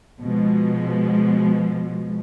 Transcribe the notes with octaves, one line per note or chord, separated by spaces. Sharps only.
B2 F3 G#3